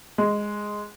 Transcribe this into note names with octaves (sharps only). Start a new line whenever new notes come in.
G#3